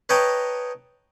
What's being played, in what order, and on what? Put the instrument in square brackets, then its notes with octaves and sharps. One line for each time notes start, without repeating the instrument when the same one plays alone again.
[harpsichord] B4 C#5 D#5 G5 A5 A#5